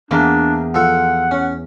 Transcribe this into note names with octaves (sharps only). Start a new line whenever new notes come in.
E2 A#3 D4
F3 A4 F#5
C#4